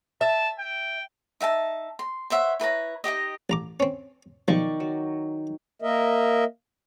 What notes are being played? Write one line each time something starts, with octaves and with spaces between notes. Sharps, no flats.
E5 A5
G5
D#4 E5 F#5 A5
C6
C5 C#5 E5 F#5
E4 B4 C#5 A#5
D#4 F4 G4 D#5
A1 A#5 D6
C4 C#4
B1 D#3 F3 D5 C#6
F#3
A#3 A#4 D#5 E5